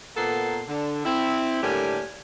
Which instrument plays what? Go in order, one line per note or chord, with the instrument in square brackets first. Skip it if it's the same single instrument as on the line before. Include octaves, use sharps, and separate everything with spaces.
[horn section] A#2 A#3 B3 A4 F#5 C6
D3
C4 E4
A2 D3 G3 A#3 G4 G#5